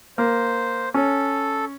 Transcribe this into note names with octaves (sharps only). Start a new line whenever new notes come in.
A#3 C5
C#4 A4